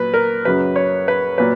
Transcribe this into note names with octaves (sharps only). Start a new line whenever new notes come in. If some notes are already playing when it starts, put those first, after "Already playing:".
Already playing: A#2 F#3 B4
A#4
F#2 C#3 F#3 B4
C#5
B4
A#2 F#3 B4